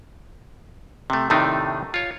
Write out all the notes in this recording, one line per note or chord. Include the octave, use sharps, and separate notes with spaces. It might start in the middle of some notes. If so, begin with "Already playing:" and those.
C3 A3
A2 C3 D#3 A3 D4 D#4
F4 C#5